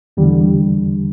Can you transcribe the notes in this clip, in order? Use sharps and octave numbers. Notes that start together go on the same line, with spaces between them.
E2 D3 G3